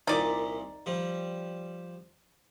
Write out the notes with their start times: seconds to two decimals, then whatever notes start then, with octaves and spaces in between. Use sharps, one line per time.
0.07 C2 A#2 D#4 D5
0.86 F3 G3